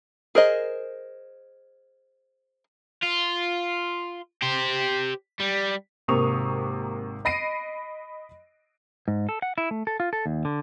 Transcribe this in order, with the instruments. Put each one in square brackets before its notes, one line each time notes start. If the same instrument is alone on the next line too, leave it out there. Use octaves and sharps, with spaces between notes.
[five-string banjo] G#4 A#4 C5 D#5
[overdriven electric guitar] F4
G4 C5
G3
[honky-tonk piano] G#1 C3 A#3 C#6 D#6 F7
D#5 B5 A#6 C7 D7 D#7
[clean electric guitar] G#2
A4
F#5
E4
A3
A4
F4
A4
D#2
D3